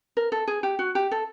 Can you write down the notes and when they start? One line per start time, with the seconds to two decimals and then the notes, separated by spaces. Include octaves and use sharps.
0.17 A#4
0.32 A4
0.48 G#4
0.63 G4
0.79 F#4
0.95 G4
1.11 A4